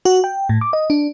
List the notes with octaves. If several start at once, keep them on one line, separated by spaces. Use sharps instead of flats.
F#4
G5
A2
D6
D#5
D4